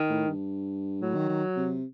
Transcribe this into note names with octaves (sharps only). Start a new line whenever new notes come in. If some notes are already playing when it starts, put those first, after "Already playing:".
Already playing: D#3
A2
G2
A2 F#3
D#3
D#3
C3